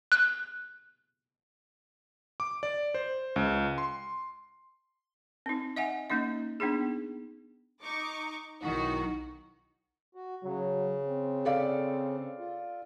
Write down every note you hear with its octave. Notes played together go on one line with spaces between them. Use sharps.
F#6
D6
D5
C5
C#2
C6
C4 D#4
D#5 E5 F#5 G#5
A#3 C#4 D#4 D#5
B3 D4 D#4 G#4
D#4 C#6 D6
B1 D#3 D#4 E4 F#4 C#6
F#4
C#3 F#3
C4
A4 D5 F5
F4